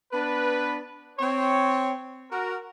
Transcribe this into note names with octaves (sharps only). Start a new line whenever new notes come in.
B3 D4 B4
C4 C#5
F#4 A#4